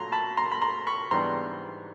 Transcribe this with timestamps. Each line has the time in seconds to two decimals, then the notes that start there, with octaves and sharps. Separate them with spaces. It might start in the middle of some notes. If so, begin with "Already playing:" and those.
Already playing: A#2 F#3 A3 A#5 C6
0.12 A5 B5
0.37 A#5 C6
0.52 B5
0.61 A#5 C6
0.87 B5 C#6
1.11 G#2 E3 G3 B3 D4 A#5 C6